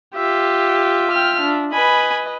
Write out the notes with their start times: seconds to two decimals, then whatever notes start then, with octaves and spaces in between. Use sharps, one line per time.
0.16 F4 G4 E5
1.12 G5 F6
1.41 D4
1.72 B4 D#5 G#5 B5